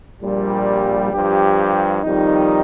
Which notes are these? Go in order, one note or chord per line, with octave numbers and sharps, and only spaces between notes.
A#1 A#2 G3
G2 F3 G4
F2 D#3 G3 D#4